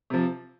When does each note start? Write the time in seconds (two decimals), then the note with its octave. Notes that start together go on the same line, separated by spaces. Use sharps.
0.10 C3 F3